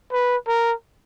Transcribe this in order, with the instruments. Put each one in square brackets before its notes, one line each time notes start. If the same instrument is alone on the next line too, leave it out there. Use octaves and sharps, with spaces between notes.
[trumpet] B4
A#4